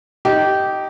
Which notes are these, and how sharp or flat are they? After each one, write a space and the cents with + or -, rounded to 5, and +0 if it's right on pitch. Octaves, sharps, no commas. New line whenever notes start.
D#4 +0 G4 -15